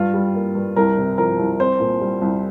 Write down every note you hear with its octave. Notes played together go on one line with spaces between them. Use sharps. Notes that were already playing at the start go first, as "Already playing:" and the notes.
Already playing: G2 F4
G3
A#3
G2
C2 A#4
C3
F3 A#4
C2
C4 C5
A#2
G3
C2